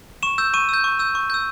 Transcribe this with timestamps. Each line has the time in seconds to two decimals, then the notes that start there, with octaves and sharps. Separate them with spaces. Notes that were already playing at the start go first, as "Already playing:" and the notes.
0.23 C#6 E7
0.38 E6 G6
0.54 C#6 D#7
0.69 E6 G6
0.84 C#6
0.99 E6 G6
1.15 C#6
1.30 E6 G6